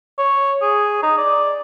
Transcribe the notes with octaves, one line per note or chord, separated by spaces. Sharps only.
C#5
G#4
D#4
D5